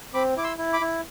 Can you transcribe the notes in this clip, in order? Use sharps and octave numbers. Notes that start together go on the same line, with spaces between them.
C4 B5 D6
E4 D6
C6 E6
E4
B5 D6
E4